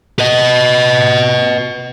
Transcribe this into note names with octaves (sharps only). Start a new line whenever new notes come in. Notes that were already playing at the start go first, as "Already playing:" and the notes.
B4 D#5